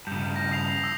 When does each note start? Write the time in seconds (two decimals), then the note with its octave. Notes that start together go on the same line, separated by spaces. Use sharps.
0.07 G2 C#3 G6
0.36 A#6
0.51 D#6 C7 F7
0.84 D#6 E6